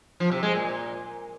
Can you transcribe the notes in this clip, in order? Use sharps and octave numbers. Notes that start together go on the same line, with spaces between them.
F3
C3
G#3
A#2